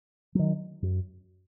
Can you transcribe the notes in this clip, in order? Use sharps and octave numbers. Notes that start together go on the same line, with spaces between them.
D#3 F#3
F#2